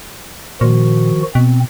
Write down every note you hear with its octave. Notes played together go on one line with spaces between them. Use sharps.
A#2 D#3 F3 F#4
B2 C4